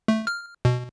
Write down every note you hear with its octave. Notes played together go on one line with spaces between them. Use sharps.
A3
F6
B2